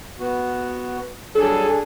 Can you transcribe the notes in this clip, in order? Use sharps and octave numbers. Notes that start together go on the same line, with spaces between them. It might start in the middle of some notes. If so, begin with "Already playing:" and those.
B3 F#4
F#3 G3 D4 G#4 A4